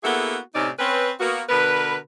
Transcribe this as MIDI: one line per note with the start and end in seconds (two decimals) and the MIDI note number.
0.03 0.36 58
0.03 0.36 59
0.03 0.36 64
0.03 0.36 66
0.03 0.36 68
0.03 0.36 69
0.55 0.70 45
0.55 0.70 48
0.55 0.70 60
0.55 0.70 61
0.55 0.70 63
0.55 0.70 74
0.79 1.10 60
0.79 1.10 61
0.79 1.10 71
1.20 1.42 58
1.20 1.42 59
1.20 1.42 66
1.49 1.97 47
1.49 1.97 50
1.49 1.97 70
1.49 1.97 71